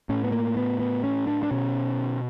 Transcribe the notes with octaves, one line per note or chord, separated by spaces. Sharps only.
A2 C#4
B3
A#3
B3
B3
C#4
D4
D4
B2 C#4